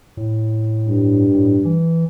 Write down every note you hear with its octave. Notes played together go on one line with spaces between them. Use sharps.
A2
G2
A2
E3